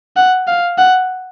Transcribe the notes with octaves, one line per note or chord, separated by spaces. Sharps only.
F#5
F5
F#5